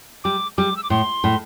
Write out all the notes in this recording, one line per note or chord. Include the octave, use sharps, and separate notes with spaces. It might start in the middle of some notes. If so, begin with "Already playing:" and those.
G3 D6
G3 D6
E6
D6
A2 C6
A2